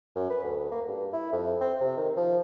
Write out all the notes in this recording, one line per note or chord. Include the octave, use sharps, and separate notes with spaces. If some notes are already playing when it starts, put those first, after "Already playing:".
F#2
B4
D2
A#3
G2
E4
F2
C4
C3
D#3
F3